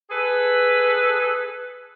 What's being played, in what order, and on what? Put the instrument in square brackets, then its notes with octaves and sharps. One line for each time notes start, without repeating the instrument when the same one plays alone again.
[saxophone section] G#4 A4 B4